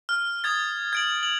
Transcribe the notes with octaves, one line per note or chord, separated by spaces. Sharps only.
F6
D#6 G#6 A6
G#6 D7 F#7
F7 F#7